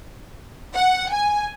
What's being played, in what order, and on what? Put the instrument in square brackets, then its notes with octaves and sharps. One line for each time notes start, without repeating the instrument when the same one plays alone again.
[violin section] F#5
G#5